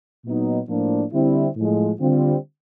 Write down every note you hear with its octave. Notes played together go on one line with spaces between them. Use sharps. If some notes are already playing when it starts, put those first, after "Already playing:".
A#2 F#3 B3 D#4
A2 F3 A#3 D4
D3 G3 C4 E4
A2 F3 G#3
D3 G3 C4 F4